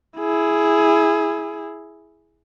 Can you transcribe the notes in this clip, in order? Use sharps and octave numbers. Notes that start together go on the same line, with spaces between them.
E4 G#4